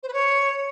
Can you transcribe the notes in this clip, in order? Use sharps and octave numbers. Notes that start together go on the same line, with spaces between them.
C5
B4
C#5